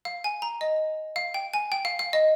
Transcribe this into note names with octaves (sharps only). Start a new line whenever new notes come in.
F5
G#5
A#5
D#5
F5
G5
G#5
G5
F5
F5
D#5